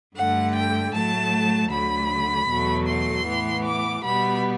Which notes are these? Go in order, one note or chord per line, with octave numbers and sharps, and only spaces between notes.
G2 D3 A3 F#5
G5
A2 F#3 A3 A5
D2 D3 F#3 B5
E2 B2 F#3 A3
C6
A2 E3 B3
D6
B2 G3 B3 B5